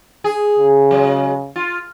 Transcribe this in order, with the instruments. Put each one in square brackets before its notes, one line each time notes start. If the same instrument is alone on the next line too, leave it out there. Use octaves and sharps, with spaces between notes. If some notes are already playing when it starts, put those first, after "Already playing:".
[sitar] G#4
[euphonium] C#3
[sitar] F#3 G#3
F4